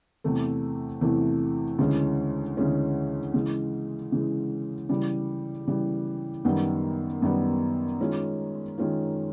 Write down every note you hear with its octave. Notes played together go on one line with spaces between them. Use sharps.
E2 C3 E3 A3
E2 C3 E3 A3
D2 C#3 E3 G#3 C#4
D2 C#3 E3 G#3 C#4
C#3 E3 G#3
C#3 E3 G#3
C#3 E3 G3
C#3 E3 G3
F#2 D#3 G3 B3
F#2 D#3 G3 B3
D#3 G#3 C#4 F4
D#3 G#3 C#4 F4